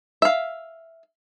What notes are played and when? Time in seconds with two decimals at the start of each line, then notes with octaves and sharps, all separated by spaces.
0.22 E5 F5